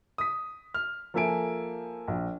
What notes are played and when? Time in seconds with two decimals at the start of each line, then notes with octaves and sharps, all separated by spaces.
0.18 D#6 B6
0.74 F6
1.14 F3 A#3 A4 E5 G#5 D7
2.08 A#1